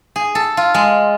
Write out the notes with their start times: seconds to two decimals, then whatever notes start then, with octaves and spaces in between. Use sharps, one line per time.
0.16 G#4
0.35 A4
0.57 F4
0.74 G#3